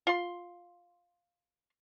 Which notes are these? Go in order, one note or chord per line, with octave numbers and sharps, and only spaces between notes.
F4 C6